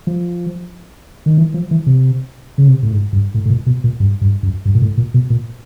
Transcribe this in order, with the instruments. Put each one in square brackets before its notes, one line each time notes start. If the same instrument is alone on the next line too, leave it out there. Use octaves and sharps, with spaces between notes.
[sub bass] F3
D#3
E3
F3
E3
C3
C#3
C3
A2
G#2
G2
A2
A2
A#2
B2
A#2
G2
G2
F#2
G2
A#2
A2
A#2
B2
A#2